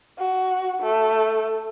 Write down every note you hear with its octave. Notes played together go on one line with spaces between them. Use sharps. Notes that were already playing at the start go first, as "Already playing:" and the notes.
F#4
A3